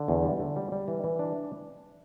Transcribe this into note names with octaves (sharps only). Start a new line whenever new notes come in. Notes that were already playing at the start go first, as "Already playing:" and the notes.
Already playing: D3
E2
G3
D3
G3
G3
E3
E3
D4